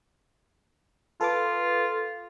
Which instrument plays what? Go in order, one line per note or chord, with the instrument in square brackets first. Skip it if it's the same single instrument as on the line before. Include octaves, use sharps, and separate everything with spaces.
[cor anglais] F4 [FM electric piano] A4 B4 D6